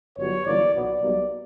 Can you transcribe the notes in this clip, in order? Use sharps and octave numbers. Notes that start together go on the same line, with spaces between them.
G1 G2 F#3 C#5
G1 F#2 E3 A#3 D5
B1 A#2 F#3 B3 D5
B1 B2 G3 A#3